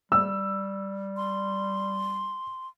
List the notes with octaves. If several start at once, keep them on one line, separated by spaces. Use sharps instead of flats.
G3 E6
C6